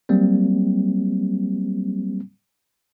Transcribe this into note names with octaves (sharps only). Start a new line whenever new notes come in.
F#3 G3 A#3 C4